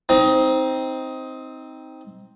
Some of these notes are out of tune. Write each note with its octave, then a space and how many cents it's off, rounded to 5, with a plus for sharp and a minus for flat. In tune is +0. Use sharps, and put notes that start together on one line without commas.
C4 +0 D#4 +20